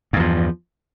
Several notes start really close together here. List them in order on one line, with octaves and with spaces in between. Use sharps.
G2 E2 F3